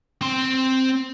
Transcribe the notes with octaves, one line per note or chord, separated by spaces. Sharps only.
C4 C6